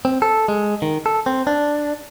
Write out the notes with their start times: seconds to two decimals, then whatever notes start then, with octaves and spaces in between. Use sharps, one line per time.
0.05 C4
0.22 A4
0.48 G#3
0.82 D#3
1.06 A4
1.26 C4
1.47 D4